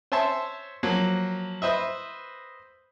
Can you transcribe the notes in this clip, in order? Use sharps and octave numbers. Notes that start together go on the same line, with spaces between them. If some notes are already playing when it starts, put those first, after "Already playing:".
C5 C#5 E5 A5 C6 C#6
F3 F#3 A#3
B4 C5 D#5 E5